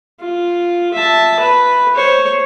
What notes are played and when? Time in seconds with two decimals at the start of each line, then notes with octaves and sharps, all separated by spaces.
0.20 F4
0.94 E5 A5
1.39 B4
1.95 C5 C#5